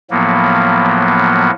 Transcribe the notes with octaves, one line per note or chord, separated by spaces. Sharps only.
A2 F3 F#3 A#3 B3